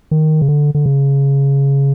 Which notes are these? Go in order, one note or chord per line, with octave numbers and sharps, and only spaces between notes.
D#3
C#3
D3
D3
C#3